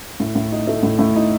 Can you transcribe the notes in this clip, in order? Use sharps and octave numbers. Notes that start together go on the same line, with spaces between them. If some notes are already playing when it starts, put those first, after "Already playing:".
A2
A2
D#4
A3
A2
A2
D#4